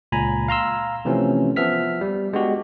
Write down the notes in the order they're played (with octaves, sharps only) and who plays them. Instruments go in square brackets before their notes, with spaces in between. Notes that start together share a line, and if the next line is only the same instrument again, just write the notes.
[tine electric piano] C#2 A#2 G#5 A#5 B5
F5 A#5 C6 E6
C3 E3 F3 A3 C4 C#4
F3 B3 E5 F6 B6
G3
G#3 B3 D4 F#4 G4